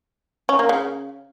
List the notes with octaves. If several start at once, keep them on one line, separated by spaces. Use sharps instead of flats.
C#4
A#3
C#3